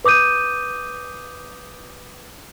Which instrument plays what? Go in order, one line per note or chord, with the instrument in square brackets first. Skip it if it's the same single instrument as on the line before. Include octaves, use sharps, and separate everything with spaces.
[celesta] B4 D6 D#6 G6 D#7